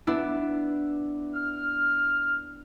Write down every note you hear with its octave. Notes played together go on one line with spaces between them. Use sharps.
B3 D4 E4
F6